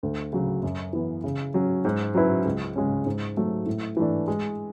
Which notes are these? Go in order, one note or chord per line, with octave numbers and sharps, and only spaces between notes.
D2
C#3 F#3
F#2
E3 B3
C#3
F#3 C#4
G#2
F#3 C#4 E4 B4
C#2
C#3 G#3 C#4
G#2
F#3 A3
A2
E3 A3 D4
G#3